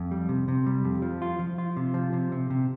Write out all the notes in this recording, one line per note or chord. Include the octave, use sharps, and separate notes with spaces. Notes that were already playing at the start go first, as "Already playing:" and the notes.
Already playing: F2
G3
C3
C3
G3
F2
F3
F4
F3
F4
C3
F3
C3
C3
C3